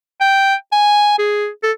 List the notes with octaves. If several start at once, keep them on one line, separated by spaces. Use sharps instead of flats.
G5
G#5
G#4
A4